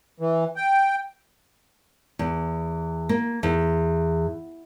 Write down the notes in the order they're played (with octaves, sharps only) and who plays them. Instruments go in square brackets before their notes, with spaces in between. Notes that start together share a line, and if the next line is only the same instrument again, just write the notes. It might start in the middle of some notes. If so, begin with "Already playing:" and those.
[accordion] E3
G5
[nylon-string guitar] E2
A#3
E2